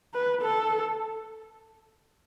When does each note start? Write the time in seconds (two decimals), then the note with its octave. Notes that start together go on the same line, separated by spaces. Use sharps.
0.14 B4
0.42 A4